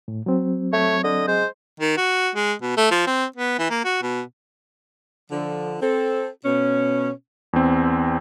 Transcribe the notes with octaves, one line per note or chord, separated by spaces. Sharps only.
A2
F#3 C4
A3 C#5
D3 D#5
G#3 C5
D#3
F#4
G#3
B2
A3
F3
C4
B3
E3
A#3
F#4
B2
D3 F3
C4 A4
B2 C#4
E2 C4